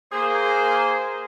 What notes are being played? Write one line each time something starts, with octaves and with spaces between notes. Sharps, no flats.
A#3 G#4 C5